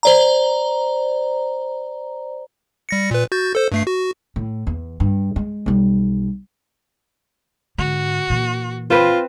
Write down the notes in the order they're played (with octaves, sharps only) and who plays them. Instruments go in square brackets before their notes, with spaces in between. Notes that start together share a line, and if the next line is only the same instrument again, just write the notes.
[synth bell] C5 D5 A#5
[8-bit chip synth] G3 A#6 C#7
A#2 B4
F#4 G6 A6
A4 C5
G2 A3 C7
F#4
[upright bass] A2
E2
G2
G#3
B1 G3
[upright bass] G#2 D3 [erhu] F#4
[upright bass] A#2 E3
[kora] C4 B4 C5 [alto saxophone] F4